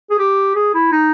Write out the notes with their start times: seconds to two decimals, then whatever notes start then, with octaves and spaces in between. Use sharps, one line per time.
0.11 G#4
0.19 G4
0.55 G#4
0.74 E4
0.92 D#4